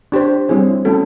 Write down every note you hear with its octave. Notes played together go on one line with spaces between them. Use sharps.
D4 G4 C5
G3 C4 E4 G#4 C#5
A3 C#4 F#4 A4